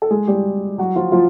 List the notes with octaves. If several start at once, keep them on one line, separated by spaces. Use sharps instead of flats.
A4
G#3 G#4
G3 G4
F#3 F#4
F3 F4
F3 F4